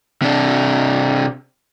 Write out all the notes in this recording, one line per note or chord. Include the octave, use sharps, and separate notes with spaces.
C3 D4